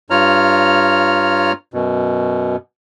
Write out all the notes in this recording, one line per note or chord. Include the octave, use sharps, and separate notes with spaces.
G2 F4 C#5 A#5 F6
F#2 B2